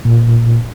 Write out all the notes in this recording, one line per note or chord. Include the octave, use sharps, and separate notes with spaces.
A#2